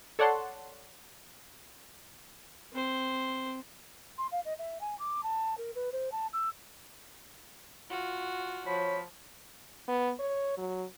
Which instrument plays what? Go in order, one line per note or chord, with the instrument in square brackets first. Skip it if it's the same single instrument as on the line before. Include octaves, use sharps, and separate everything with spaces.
[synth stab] A4 C#5 D5 F#5 A5 C6
[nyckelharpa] C4 C5
[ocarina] C6
F5
D#5
E5
G#5
D6
A5
A#4
B4
C5
A5
E6
[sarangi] F4 [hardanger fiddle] F#4
[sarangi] F3 [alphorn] C#5 [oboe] B5
[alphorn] B3
C#5
F#3